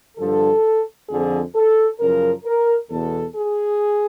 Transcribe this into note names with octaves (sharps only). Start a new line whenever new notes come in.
G2 D3 F3 A4
F2 D3 F3 G#4
A4
F#2 C#3 F3 A#4
A#4
E2 B2 A4
G#4